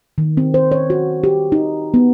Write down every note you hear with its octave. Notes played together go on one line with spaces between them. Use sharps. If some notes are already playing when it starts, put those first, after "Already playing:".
D#3
C4
C5
C#5
F#4
G4
D#4
B3